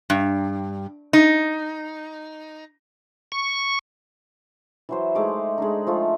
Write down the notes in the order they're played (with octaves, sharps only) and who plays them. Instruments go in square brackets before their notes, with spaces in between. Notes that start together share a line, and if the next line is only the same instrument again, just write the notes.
[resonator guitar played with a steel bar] G2
D#4
[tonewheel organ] C#6
[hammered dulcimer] E3 F#3 C5
G#3 A3 D#4 D6
G#3 D4 D#4
F3 A3 F4 F5